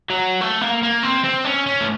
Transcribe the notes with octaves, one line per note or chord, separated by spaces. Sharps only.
F#3
A3
A#3
A#3
C4
C4
C#4
C#4
A3